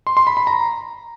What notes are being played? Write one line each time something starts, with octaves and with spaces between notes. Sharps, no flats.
C6
C6
B5
B5
A#5